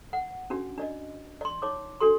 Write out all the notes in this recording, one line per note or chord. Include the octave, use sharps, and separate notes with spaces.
F#5
C#4 D4 F#4
D4 D5 D#5
D5 C6
D#4 C#5 D6
D4 F#4 A4 C6